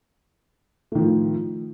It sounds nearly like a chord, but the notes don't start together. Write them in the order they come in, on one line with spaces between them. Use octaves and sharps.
A3 D#3 F3 A2